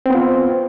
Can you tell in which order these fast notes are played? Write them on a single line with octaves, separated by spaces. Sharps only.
C4 B3 F4